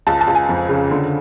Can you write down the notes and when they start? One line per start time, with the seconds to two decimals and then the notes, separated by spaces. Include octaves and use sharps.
0.07 C#2 A5
0.21 A5
0.27 C#2
0.35 G#5
0.49 F2
0.69 C#3
0.91 D3